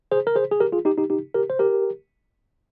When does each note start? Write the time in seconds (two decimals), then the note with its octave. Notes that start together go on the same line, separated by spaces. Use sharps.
0.12 G#4 C5
0.27 A#4
0.36 G#4 C5
0.51 G#4
0.60 G4 A#4
0.72 F4 G#4
0.85 D#4 G4
0.97 D#4 G4
1.10 D#4 G4
1.34 G4 A#4
1.50 C5
1.59 G4 A#4